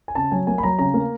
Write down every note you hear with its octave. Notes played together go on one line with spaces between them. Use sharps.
G#5
C#3 A5
F#3 G#5
A#3 G#5
B5
F#3 A#5
C#3 A#5
A#3